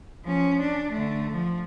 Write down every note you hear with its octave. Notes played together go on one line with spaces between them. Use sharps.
F3 C#4
D4
D3 A3
F3